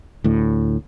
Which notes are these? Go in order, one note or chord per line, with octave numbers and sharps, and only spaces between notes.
D2 A2